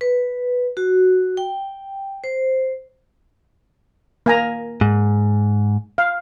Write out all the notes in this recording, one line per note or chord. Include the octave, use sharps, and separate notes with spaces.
B4
F#4
G5
C5
A#3 G#5 A#5
G#2
F5